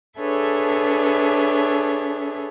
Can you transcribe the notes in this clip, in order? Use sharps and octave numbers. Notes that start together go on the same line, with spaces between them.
D4 G#4 A4 B4 C#5 E5